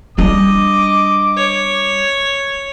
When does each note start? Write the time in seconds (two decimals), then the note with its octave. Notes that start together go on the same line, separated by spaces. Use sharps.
0.18 G3 D4 D#5 D6
1.36 C#5